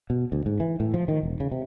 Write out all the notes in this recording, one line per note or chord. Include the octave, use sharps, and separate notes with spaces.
B2
D2
G#2
E3
A2
F3
D#3
E1
C#3
C3